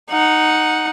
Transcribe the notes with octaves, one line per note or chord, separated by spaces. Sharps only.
D#4 F#5